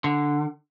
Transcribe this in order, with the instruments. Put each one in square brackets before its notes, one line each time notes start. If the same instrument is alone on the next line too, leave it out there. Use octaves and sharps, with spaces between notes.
[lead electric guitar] D3